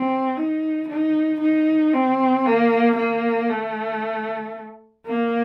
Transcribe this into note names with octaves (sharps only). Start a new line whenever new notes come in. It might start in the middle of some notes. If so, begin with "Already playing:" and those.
Already playing: C4
D#4
D#4
D#4
C4
A#3
A#3
A3
A#3